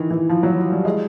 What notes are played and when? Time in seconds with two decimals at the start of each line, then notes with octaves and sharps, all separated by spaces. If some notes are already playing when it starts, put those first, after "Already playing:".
Already playing: D#3 E3
0.11 E3
0.29 F3
0.43 F#3
0.72 G3
0.85 G#3